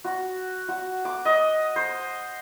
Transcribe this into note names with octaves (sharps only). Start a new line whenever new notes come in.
F#4
F#4
D6
D#5
C5